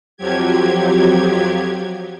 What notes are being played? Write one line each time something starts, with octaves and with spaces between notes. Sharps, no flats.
F2 F3 F#3 G4 G#6